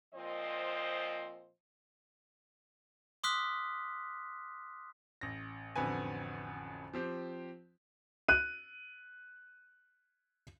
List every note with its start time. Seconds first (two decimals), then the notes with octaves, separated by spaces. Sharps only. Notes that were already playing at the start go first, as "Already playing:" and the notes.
0.14 A#2 F3 C4 C5 D#5
3.24 C6 D6 D#6 F6 F#6 B6
5.21 A1 A#6
5.76 A1 F2 D3 F#4 B4 G#5
6.94 F3 C4 G4
8.28 F#6 D#7